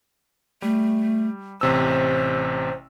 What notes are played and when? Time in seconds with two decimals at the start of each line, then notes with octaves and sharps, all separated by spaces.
0.62 G3 A3
1.61 A1 C3 C5 E6